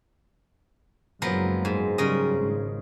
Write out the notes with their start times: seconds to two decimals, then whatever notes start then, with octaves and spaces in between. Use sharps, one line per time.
1.22 F#1 F3 F#3 G#3 B3 A#4
1.65 G#2
1.98 C#3 F#3 G3 A#4 D#5
2.32 G#1